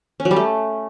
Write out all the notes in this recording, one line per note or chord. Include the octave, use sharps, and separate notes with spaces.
C#4
F#3
G3
A3